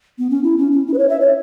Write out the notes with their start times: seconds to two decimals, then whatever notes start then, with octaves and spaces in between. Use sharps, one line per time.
0.18 B3
0.30 C#4
0.43 E4
0.58 C#4
0.72 C#4
0.87 E4
0.93 B4
0.98 C#5
1.09 E5
1.20 C#5